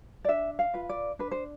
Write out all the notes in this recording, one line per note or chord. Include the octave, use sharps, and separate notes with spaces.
D5
D4 E5
F5
F4 B4
D5
D4 B4
C5